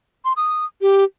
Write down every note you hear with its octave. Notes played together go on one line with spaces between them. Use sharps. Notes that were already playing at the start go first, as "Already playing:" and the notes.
C6
D#6
G4